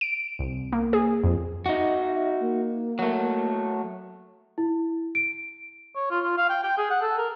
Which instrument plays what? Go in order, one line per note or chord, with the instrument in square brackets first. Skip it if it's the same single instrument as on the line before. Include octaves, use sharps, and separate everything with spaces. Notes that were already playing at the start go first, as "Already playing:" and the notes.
[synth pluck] D7
C2
A#3
G#4
F2
[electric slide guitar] D#4 F#4 [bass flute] E5
[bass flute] A#3
[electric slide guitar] F#3 A3
[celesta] E4
D7
[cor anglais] C#5
F4
F4
F5
G5
G5
G#4
F#5
A4
A#4